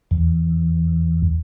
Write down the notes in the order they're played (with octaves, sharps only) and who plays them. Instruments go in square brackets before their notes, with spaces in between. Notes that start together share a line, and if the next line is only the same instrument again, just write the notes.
[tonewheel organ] E2